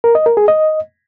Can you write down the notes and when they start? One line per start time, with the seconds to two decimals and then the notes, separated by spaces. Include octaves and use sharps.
0.04 A#4
0.15 D#5
0.26 A#4
0.37 G#4
0.48 D#5